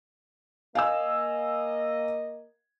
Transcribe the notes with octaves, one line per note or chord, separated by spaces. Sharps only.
A#3 D#5 F5 G#5 E6